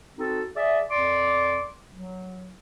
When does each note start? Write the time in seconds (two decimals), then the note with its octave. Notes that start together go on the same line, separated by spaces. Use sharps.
0.17 C4 D#4 F#4 A4
0.56 G#4 D5 E5
0.90 F2 D5 C6 D6
1.94 F#3